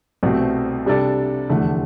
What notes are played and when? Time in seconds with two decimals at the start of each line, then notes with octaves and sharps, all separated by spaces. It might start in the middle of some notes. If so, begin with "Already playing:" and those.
0.23 C2 B2 A3 C4
0.86 C3 G3 D4 A4 D5
1.50 F1 E2 D3 A3